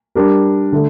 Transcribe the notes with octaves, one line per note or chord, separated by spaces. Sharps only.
G3 D4 G4 A#4
D3 A3